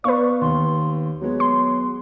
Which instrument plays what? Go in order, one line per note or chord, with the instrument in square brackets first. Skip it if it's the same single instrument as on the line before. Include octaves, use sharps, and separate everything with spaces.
[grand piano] B3 F5 [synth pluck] B4 C#6 [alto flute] D5
[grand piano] D#2 [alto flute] C6
[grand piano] F#3 G#3 B3 [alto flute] C#5
[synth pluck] C6